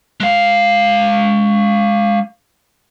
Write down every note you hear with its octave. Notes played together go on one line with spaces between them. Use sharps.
G#3 F5